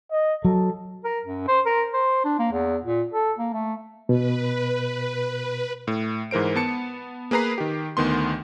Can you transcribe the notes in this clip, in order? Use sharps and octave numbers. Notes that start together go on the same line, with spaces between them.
D#5
F#3 A4
A#4
F#2
C5
A#4
C5
D4
A#3
E2
A#2
A4
A#3
A3
B2 B4
A2
G#2 E3 A#4 C5 D7
B3 A5 C#7
A#3 G#4 B4 A#5 C7
D#3 G4
D2 D#3 B3 C6